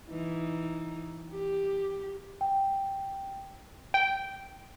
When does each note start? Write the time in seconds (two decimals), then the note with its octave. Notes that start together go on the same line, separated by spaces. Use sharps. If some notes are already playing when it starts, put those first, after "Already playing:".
0.10 E3 D#4
1.31 G4
2.41 G5
3.94 G5